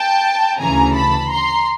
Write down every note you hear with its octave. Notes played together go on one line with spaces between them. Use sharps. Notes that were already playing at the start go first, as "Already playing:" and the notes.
Already playing: G5 A5
D2 C#3 E3 G#5 A#5
A5 B5
A#5 C6